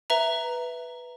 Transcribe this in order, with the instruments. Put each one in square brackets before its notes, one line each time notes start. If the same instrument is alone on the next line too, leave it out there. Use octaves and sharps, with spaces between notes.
[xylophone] B4 E5 A#5